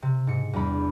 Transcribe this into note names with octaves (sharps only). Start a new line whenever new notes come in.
C3
G#2 C#7
E2 G3 D4 B5